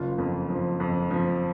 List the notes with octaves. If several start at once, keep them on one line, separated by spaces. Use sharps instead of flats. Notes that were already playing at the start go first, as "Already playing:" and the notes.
Already playing: F#1 F4
F2
F3
F2
F3